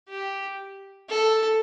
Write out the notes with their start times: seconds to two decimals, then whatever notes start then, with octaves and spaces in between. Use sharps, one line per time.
0.09 G4
1.09 A4